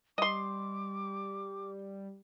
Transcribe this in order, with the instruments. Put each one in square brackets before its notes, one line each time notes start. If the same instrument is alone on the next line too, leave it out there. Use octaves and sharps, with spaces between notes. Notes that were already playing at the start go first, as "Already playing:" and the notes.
[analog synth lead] G3 [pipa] D#5 C6 [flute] D6